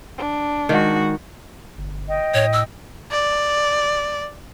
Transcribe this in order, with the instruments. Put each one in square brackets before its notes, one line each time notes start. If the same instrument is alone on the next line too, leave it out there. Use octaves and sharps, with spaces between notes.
[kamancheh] D4
[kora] D#3 [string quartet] G#3 F#4
[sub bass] G1
[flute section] D#5 G5
[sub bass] A2 [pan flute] C#5
[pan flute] E6
[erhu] D5